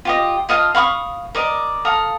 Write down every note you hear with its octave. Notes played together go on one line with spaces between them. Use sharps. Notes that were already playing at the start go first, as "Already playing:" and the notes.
F4 G4 D#5
F4 D#5 F5 A5
F5 B5 C#6 D#6
A#4 D5 D#5
A4 F5 A#5 D#6